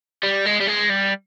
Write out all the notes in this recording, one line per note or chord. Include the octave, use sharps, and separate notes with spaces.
G3
G#3
G3
G#3
G3